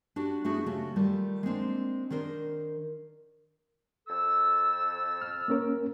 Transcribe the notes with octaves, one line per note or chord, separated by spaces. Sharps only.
D4 F#4 G4
A3 B3 D4 E4 F#4 G#4
C#3 A3 F#4 G4
D#3 G3 A3 F4
G#3 A#3 C4 D4
D#3 D4 A#4 C5
F2 A4 E6
F6
A#3 C#4 A#4